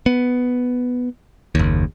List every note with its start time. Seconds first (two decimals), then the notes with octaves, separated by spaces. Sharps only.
0.06 B3
1.55 F#1 D#2